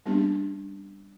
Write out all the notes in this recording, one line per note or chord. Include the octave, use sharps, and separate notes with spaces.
G3 A#3 B3 C#4 D4 G4